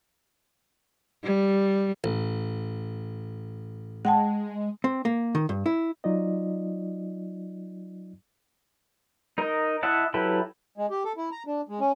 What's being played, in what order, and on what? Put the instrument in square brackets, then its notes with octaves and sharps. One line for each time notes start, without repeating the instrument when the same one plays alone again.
[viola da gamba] G3
[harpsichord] A1
[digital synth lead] G#3 [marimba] F#5 G5 A5
[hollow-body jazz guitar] C4
A#3
D#3
G2
E4
[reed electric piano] F#3 D#4 F4 D5 D#5
[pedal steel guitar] D#4 A#4 D#5
E4 D#5 E5 F#5 A5
F#3 E4 G4 A4 B4
[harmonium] G#3
G4
A4
E4
A#5
D4
G#3
C#4